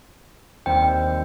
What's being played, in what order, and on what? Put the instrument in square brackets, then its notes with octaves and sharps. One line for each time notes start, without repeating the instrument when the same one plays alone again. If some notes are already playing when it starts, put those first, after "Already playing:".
[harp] D#2 G3 C4 [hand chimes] G5